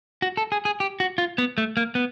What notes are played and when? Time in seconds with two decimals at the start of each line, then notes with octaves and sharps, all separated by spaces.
0.22 F#4
0.37 A4
0.52 G#4
0.65 G#4
0.80 G4
1.00 F#4
1.18 F4
1.38 B3
1.58 A3
1.77 A#3
1.95 B3